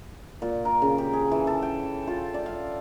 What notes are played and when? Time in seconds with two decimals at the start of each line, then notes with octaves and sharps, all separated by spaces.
0.42 A#2
0.65 A#4
0.82 C#3
0.98 G4
1.13 G#4
1.32 E3
1.47 A4
1.62 G5
2.07 F4
2.34 D5
2.46 F5